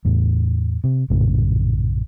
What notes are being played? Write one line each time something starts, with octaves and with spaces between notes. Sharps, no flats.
E2 A2
C3
A#1 F#2 A2 C#3